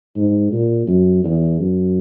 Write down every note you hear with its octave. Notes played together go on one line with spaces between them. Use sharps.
G#2
A#2
F#2
E2
F#2